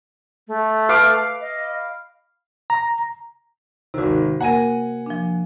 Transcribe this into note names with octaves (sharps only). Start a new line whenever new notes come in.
A3
B4 F5 D6
D#5
A#5
G#1 C3 D#3 F#4
A#3 A#4 F#5 G#5 D#7
F3 D4